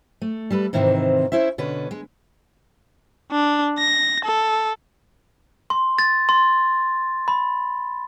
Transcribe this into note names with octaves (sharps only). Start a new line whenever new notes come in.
A3
G3 A4 B4
G#2 C3 D#3 E3 C4
C#4 E4 C5 E5
B2 D3 C#4 B4
G#3
D4
A#6
A4
C6
A6
C6
B5